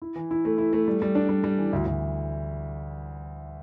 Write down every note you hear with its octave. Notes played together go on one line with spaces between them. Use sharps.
E4
E3
E4
A3
E4
A3
G3
G3
D4
G3
G3
E3
D2
D2